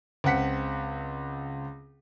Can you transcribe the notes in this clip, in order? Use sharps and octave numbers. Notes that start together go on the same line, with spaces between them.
C#2 C4 F#5 B6 C#7